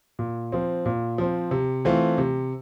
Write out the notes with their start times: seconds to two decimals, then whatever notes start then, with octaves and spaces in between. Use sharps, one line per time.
0.19 A#2
0.52 F3 C4
0.86 A#2
1.18 F3 C4
1.51 C3
1.85 E3 A3 C4 F4
2.18 C3